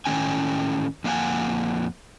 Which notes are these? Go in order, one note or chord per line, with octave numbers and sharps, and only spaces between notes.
A2 D#3 A3 C#4 G5 G#5
F2 A#3 F5 F#5 G#5